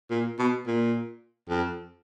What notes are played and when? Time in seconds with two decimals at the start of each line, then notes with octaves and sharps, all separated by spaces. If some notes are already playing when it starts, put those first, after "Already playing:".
0.11 A#2
0.39 B2
0.67 A#2
1.49 F2